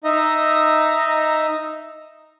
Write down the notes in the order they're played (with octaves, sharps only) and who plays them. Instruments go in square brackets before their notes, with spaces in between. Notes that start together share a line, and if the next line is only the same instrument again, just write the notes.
[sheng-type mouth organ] D#4 D#5 E5 A#5